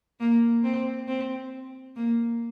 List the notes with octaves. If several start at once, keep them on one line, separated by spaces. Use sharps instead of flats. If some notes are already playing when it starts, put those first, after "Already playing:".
A#3
C4
C4
A#3